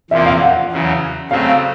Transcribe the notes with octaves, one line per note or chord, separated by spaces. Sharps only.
E2 C3 F3 A#3 E5
F5
F#5
E2 C#3 F#3
C#3 F#3 A3 C4 F5